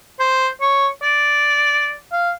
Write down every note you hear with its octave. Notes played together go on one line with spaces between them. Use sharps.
C5
C#5
D5
F5